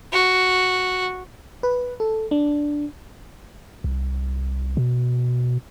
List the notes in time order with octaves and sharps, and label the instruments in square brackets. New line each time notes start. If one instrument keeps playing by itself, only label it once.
[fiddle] F#4
[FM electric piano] B4
A4
D4
[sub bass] C2
B2